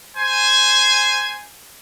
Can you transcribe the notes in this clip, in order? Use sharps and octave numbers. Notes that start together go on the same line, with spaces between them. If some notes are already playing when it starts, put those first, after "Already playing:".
C5 G#5